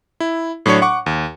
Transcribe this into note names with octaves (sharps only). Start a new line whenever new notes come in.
E4
A2 F#3 D4 C#5 C#7
F#5 C#6 D6
D#2